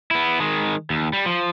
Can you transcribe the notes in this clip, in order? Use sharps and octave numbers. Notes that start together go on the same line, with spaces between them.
B3 E4
D#3 G#3
D#2
G3
F3